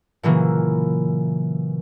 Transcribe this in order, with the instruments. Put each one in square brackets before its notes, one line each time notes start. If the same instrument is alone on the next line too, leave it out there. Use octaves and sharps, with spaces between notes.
[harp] A#2 C#3 E3 F#3 A#3